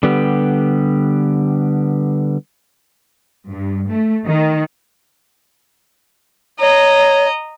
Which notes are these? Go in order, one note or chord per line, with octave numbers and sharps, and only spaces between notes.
D3 G3 B3 G4
G2
A3
D#3
C#5 D#5 A#5